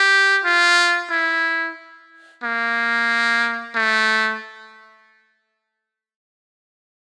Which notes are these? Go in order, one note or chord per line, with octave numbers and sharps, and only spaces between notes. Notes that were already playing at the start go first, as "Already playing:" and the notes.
Already playing: G4
F4
E4
A#3
A3